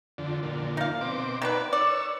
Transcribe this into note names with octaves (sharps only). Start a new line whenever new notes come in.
F2 D3
F2 A#2 D3
D#4 F5
B2 C4 D6
D#3 F#3 B4 D5
C#5 D5 E6